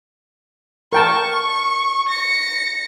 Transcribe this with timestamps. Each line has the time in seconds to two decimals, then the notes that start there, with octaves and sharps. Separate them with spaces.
0.93 A#4 G5 A5 C#6
2.09 A#6 C#7